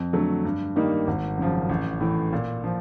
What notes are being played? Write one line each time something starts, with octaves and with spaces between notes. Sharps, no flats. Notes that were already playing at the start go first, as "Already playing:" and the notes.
Already playing: F2
D3 F#3 A3
G2
D#3 G3 A#3 D#4
G#1
F#2 C#3 F3
A1
A2 E3
A#2
F3